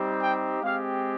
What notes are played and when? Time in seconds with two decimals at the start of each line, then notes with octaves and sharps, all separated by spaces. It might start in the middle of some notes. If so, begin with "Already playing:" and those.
Already playing: G3 C4 D#4 G4
0.19 G5
0.63 G#3 C4 G4 F5